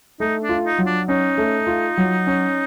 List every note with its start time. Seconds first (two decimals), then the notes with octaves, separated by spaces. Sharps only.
0.20 A3 D#4
0.42 D4
0.49 F4
0.65 D#4
0.78 F#3
0.86 D4
1.08 C#4 D#4
1.38 A3
1.67 F4
1.97 F#3
2.27 C#4